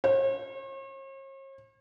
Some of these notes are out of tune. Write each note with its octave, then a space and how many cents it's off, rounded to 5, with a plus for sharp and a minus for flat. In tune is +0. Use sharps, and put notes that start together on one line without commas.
C#5 -45